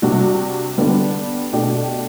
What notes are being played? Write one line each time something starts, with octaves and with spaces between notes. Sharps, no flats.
C3 G3 D4 F#4
D3 G3 B3 D4 G4
B2 A3 D4 G4